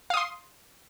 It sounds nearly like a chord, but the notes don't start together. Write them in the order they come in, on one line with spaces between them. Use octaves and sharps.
F5 D#6 C6